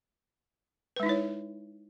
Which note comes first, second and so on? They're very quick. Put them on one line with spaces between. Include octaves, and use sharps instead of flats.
B4 G#3 D#4 E4 C#5